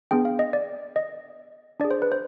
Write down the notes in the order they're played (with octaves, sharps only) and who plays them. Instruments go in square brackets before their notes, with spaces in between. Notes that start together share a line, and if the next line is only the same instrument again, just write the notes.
[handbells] B3 D4 G#4 G5
F5
D#5
D5
D#5
D4 G#4 D5
C5
B4
C5